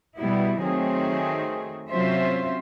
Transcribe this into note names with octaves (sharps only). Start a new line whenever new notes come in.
B2 G3 B3 E4
D#3 F#3 A3 C4 G#4
C3 F#3 C#4 F4 C5 E5